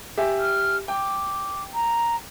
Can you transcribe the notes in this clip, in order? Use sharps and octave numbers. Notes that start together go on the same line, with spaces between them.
G4 E5 G#5
F6
G5 D6
A#5